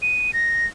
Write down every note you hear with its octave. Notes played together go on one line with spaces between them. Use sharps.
D#7
A#6